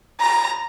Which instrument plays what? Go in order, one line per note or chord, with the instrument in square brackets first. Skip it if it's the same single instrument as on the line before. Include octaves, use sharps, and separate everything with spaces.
[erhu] A#5